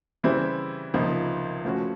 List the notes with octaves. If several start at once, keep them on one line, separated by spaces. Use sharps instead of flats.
C#3 E3 G3 C4 E4
C#2 C3 F3 A#3 D#4
F3 A3 C#4 F#4